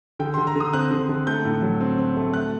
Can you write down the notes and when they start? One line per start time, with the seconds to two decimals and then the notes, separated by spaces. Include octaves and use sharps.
0.19 D3 G5
0.34 D3 C6
0.47 A#5
0.55 D3 D#6
0.73 C4 F#6
0.91 D3
1.09 D3
1.27 A3 G6
1.45 A2
1.62 F#3
1.80 C4
1.98 C4
2.17 A3
2.34 A3 F#6